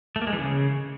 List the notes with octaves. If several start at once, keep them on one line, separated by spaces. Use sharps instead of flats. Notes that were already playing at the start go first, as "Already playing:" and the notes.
A3
A#3
G#3
E3
C#3